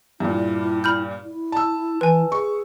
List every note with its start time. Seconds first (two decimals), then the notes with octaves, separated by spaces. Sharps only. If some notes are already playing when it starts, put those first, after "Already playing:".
0.20 G2 A#2 E4
0.84 B5 F6 G6
1.24 E4
1.52 A5 E6
2.01 E3 B4 G#5
2.32 G#4 C#6